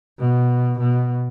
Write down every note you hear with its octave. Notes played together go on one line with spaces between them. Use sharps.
B2
B2